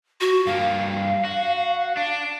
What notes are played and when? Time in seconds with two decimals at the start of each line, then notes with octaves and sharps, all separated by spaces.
0.21 F#4
0.47 G2 A#3 F5
1.25 F#4
1.97 D4